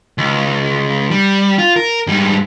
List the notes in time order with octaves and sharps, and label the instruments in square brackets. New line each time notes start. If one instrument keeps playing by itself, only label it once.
[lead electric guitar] C#2
G3
F4
A#4
G#2 G3